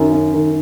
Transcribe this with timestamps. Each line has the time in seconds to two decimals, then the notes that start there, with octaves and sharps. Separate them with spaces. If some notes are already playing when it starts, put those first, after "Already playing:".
Already playing: F#2 D#3
0.13 F#2
0.34 D#3